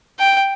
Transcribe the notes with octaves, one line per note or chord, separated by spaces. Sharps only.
G5